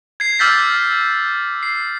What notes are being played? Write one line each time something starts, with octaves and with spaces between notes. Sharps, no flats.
G#6 C7
D6 E6 F6 G6 A6 B6
C7